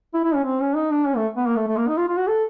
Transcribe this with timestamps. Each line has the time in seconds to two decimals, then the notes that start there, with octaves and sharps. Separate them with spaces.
0.14 E4
0.24 E4
0.35 C#4
0.44 C4
0.60 C#4
0.76 D#4
0.91 D4
1.06 C#4
1.16 A3
1.36 B3
1.46 A#3
1.56 A3
1.67 A3
1.77 A#3
1.88 D#4
1.97 F4
2.08 F4
2.17 F#4
2.28 A4